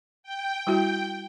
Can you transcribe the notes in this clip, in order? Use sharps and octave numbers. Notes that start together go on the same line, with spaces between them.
G5
G3 E4 F#4